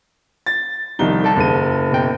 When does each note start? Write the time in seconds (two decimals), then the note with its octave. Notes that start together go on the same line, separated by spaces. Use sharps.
0.46 A6
0.99 C2 D#3 F3 D#4 G7
1.24 A4 D5 A5
1.36 F#1 D#7
1.91 B2 G5